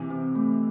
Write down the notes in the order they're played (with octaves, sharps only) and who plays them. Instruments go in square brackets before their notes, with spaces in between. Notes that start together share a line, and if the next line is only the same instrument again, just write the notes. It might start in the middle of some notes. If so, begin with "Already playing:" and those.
Already playing: [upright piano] C3 E3
[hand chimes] C4
A3